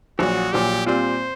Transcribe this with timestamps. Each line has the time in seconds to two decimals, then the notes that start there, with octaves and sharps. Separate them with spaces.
0.19 A#1 A#2 F#3 F#4
0.53 A#1 A#2 F#3 G4
0.86 A#2 G3 C4 F4 C5